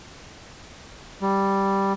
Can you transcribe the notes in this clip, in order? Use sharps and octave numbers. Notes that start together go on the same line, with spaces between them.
G3